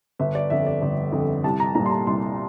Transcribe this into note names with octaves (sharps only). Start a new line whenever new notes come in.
G1 E5
D5
F2 D3 E5
D5
G1
F2
D3
C2 A5
A#5
A#2 G3 A#5
C6
A#5
C2 C6